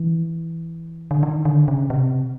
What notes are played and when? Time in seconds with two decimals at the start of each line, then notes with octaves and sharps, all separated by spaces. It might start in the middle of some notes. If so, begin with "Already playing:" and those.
Already playing: E3
1.11 D3
1.23 D#3
1.45 D3
1.68 C#3
1.90 C3